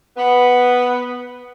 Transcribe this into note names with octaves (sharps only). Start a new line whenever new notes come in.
B3